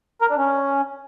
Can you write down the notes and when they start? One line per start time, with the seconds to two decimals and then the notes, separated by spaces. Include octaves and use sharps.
0.21 A#4
0.30 D4
0.38 C#4